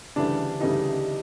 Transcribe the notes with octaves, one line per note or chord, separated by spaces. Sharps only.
D2 C#3 E3 G3 D4
D2 C#3 E3 G3 D#4